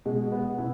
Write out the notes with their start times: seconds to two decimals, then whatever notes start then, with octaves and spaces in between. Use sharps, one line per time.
0.05 B2 G#3
0.32 B3
0.58 B2 E4